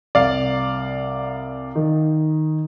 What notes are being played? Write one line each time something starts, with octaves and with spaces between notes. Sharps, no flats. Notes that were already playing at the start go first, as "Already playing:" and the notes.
C2 D5 F5
D#3